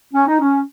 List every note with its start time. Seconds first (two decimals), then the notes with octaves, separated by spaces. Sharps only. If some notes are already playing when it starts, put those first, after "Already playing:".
0.14 C#4
0.27 D#4
0.41 C#4